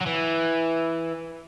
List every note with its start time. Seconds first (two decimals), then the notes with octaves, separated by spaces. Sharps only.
0.01 F#3
0.07 E3